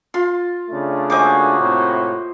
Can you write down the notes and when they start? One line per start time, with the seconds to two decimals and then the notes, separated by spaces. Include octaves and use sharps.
0.14 F4 C6
0.69 C#3 A3 D4
1.10 A#3 F#4 C5 D#5 G#5 D6
1.57 A2 C3 C4